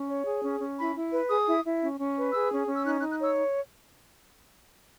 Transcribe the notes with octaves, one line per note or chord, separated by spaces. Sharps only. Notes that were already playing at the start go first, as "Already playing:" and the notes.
Already playing: C#4
C#5
G#4
C#4
C#4
E4 B5
E4
B4
G#4 D#6
E4
E4
C#4
C#4
B4
G#4 E6
C#4
C#4
E6
D#4 F#6
F#6
D#4
F#6
C#5 E6